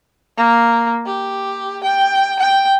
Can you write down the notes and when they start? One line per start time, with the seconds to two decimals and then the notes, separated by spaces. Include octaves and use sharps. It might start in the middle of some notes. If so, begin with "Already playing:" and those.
0.37 A#3
1.06 G4
1.84 G5
2.39 G5